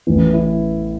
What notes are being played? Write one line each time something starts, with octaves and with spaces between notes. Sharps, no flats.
A1 A2 E3
E4